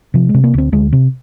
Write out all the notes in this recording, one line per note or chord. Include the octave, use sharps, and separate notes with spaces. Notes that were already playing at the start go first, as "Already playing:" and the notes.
C3 F3
G#3
C3
A#3
D2 C4
D2 G#3
C3